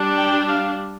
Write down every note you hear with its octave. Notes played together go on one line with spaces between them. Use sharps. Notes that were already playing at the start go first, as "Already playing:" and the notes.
Already playing: G3 D4
G5
F5